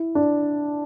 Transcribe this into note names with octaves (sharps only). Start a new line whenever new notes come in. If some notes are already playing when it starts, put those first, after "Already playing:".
Already playing: E4
D4